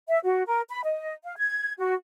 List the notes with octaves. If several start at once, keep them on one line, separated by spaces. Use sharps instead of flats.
E5
F#4
A#4
B5
D#5
F5
G#6
F#4